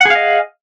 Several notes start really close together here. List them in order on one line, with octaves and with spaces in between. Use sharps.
F#5 G#4 F5 D#5